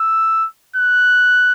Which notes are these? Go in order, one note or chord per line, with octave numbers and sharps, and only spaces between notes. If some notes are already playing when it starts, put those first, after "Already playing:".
Already playing: E6
F#6